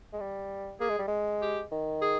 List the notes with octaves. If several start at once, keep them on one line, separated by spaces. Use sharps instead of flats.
G#3
G3
A#3 G#4
G#3
G3
G#3
G4
D#3
G#4